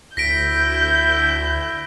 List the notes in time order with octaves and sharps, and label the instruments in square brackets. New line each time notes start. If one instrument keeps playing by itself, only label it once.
[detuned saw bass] D2 [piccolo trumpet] E4 [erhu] G6 [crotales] A#6 B6 D7